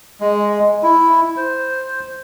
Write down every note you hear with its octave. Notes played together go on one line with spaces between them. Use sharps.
G#3
E4
C5